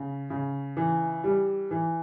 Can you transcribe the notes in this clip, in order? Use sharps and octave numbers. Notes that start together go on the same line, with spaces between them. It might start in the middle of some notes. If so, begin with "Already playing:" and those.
Already playing: C#3
C#3
E3
G3
E3